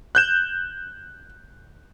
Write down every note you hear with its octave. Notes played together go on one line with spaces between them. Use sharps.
F#6 G6 E7